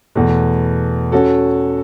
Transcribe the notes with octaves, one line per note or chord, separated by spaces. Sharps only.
E2 B2 A3
C#4 F#4 A4